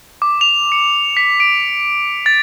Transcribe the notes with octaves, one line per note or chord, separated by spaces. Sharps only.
D6
F7
C#7
B6
D7
A6